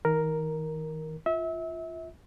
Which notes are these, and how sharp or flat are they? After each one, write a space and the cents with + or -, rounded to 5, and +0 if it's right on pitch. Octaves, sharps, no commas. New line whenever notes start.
D#3 +40 A#4 +0
F4 +0 E5 -30